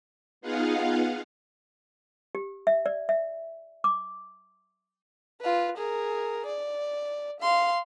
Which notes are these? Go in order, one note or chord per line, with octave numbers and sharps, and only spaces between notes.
B3 D#4 F4 G#4 F5 F#5
G4
E5
D5
E5
D6
F4 B4
G#4 A#4
D5
F5 C6